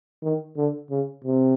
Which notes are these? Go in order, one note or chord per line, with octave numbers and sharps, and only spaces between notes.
D#3
D3
C#3
C3